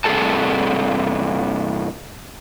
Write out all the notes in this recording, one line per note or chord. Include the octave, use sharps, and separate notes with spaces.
G2 C3 G#3 G#4 A4 A5